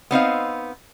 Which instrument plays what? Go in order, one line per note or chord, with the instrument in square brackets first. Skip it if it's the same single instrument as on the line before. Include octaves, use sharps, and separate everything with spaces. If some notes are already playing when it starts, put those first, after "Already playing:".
[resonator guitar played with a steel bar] B3 C4 D#4 F5